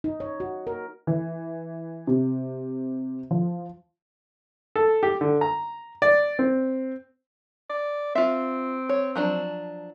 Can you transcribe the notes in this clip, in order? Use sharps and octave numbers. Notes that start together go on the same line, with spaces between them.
D#4
C#5
F#4
A#4
E3
C3
F3
A4
G4
D3
A#5
D5
C4
D5
C4 F4 E5
C#5
F3 F#3 D4